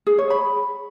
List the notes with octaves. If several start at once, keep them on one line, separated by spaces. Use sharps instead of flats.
G#4
C#5
B5